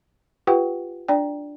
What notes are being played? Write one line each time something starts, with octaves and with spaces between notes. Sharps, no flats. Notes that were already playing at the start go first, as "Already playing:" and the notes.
F4 G4 B4 F#5 G5
D4 D5 G5